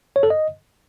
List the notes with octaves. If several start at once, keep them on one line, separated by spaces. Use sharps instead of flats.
C#5
A4
D#5